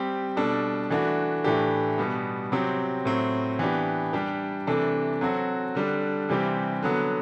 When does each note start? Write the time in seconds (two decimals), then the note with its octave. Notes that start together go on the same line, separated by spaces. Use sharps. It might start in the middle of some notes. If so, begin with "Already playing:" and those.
Already playing: G3 C4 G4
0.36 B2 G3 D4 A4
0.90 E3 A3 D4 F#4
1.44 A2 E3 A3 D4 G4
1.98 B2 G3 B3
2.52 C3 F#3 C4 G4
3.05 A2 F#3 C4
3.59 E3 B3 D4 G4
4.13 G3 D4 G4
4.67 C3 E3 A3 D4 A4
5.21 F#3 C4 F#4 A4
5.75 D3 G3 D4
6.29 C3 E3 G3 C4 G4
6.82 D3 F#3 B3